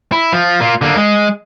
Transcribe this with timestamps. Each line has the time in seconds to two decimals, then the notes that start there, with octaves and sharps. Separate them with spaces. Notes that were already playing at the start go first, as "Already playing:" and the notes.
0.12 E4
0.33 F3
0.60 A#3 F4
0.82 D3 A#3
0.97 G#3